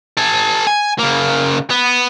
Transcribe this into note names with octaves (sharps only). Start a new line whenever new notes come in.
A4 G#5
G#5
C#3 A#3
B3